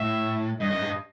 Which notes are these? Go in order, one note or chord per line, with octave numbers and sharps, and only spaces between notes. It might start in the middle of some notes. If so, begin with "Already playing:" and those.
Already playing: A2 E5
G2 D#5
F#2
G2